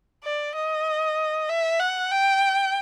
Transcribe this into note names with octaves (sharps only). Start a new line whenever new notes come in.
D5
D#5
E5
F#5
G5